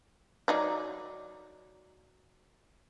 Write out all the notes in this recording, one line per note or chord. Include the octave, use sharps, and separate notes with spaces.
F#3 D#4 D5